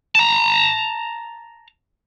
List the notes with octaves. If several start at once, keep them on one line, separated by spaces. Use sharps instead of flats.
A5 A#5